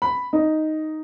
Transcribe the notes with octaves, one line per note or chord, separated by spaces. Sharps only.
B5
D#4